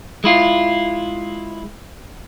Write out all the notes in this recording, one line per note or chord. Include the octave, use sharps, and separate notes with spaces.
G#3 E4 F4